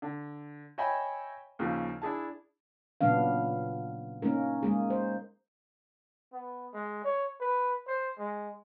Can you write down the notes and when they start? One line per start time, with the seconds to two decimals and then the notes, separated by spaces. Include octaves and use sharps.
0.02 D3
0.78 C#5 D#5 E5 G5 G#5 B5
1.59 D#2 C#3 F3
2.02 D4 E4 G#4 A5
3.01 A#2 C#3 F#3 B3 D4 F5
4.22 A#3 C#4 D#4 A#4
4.63 G#3 A#3 G#4
4.90 C5
6.33 B3
6.73 G#3
7.04 C#5
7.40 B4
7.88 C5
8.19 G#3